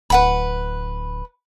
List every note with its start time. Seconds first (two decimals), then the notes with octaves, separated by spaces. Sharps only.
0.10 D1 B4 F#5 B5